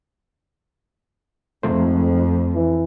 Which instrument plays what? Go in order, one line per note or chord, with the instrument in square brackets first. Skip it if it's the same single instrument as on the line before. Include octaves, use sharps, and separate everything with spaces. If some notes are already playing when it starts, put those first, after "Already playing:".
[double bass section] F2 [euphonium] G#2 [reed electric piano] F3 A3 C5
[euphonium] E3